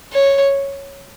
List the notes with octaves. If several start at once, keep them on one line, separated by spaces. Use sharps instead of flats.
C#5